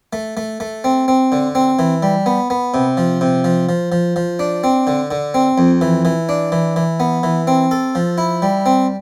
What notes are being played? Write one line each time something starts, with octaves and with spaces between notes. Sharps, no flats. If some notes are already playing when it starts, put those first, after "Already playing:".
A3
A3
A3
C4
C4
D3
C4
E3
G3
B3
B3
C3
F3
C3
F3
F3
F3
F3
D4
C4
D3
D3
C4
F2
E3
E3
D4
E3
E3
B3
E3
C4
A4
F3
E4
G3
C4